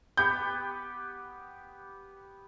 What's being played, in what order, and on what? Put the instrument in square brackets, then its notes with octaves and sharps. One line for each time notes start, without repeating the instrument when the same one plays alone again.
[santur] B3 G4 B4 [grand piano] G6